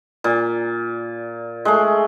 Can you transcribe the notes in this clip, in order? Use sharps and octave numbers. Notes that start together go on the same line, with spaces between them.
A#2
G#3 A3